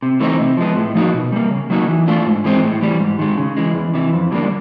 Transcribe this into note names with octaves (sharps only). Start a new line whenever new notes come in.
C3
E3 A3 C4 D#4
C3
F3 G#3 B3
A2
F3 A#3 D#4 F#4
B2
G3 A#3
C#3
F#3 A#3 D#4 F#4
E3
A3 D4 F4
G#2
E3 G#3 C4
A2
E3 G3
G#2
D#3 G#3
C#3
E3 G#3
E2
C3 E3
F2
D3 G3 A#3 D4